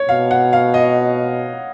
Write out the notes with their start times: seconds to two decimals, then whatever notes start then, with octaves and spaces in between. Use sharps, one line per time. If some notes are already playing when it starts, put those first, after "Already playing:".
Already playing: C#5
0.09 B2 F5
0.31 F#5
0.53 F5
0.74 D#5